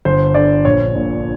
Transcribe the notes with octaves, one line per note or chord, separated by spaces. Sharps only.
G1 C5
D3 D5
A#1 C#5
A#2